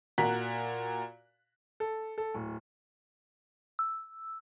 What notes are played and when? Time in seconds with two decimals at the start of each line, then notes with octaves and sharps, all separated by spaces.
0.18 A#2 F#4 A#5 F#6 B6
1.80 A4
2.18 A4
2.34 D1
3.79 E6